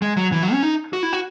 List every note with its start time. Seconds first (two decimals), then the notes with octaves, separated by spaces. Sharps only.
0.02 G#3
0.17 F#3
0.32 E3
0.42 F#3
0.53 C#4
0.63 D#4
0.93 F#4
1.03 E4
1.13 F#4